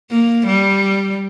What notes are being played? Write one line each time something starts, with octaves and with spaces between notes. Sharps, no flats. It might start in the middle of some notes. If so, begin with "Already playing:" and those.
A#3
G3